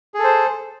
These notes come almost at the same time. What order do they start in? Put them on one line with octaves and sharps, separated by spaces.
G#4 A4 C5